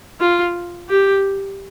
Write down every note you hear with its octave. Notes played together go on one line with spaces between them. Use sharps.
F4
G4